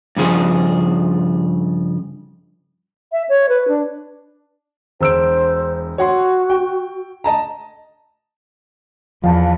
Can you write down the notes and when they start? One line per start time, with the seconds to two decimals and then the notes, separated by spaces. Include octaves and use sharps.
0.17 G2 C#3 F3 G#4
3.12 E5
3.29 C#5
3.49 B4
3.68 D4
5.01 E1 C5 E6 D7
5.98 F#4 C#5 F#5 C6
6.50 G5
7.24 D#5 A5 A#5
9.24 E2 F3 F5 A5